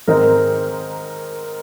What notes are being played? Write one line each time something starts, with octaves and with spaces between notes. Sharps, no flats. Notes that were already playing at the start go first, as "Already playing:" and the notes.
G#2 D#3 G#3 C4 D#4 A#4